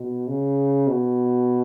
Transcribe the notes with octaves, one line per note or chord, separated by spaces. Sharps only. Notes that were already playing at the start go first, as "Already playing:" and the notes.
Already playing: B2
C#3
B2